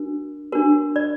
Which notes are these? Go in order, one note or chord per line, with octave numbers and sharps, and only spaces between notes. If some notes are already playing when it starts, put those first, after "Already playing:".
Already playing: D4 F#4 A#4
D4 F#4 A#4
D5